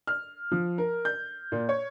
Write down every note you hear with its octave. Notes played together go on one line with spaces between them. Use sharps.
F6
F3
A#4
G6
A#2
C#5